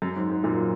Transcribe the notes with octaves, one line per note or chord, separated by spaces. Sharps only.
F#2
G#2
G#2
F#2 A#2